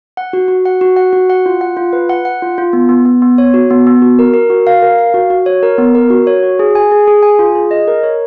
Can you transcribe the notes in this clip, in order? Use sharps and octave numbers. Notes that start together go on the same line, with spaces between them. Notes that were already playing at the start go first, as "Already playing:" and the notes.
F#5
F#4
F#4
F#5
F#4
F#5
F#4
F#5
F4
F#5
F4
B4
F#5
F#5
F4
F4
B3
B3
B3
B3
C#5
F#4
B3
B3
F#4
A#4
A#4
F#4
F5
A#4
F5
F#4
F#4
C#5
A#4
B3
A#4
F#4
C#5
F#4
G#4
G#5
G#4
G#4
G#5
F4
G#4
D#5
A#4
C#5